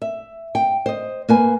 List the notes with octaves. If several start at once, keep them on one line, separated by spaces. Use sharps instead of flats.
E5
G5
C5 D#5
A#3 B4 G#5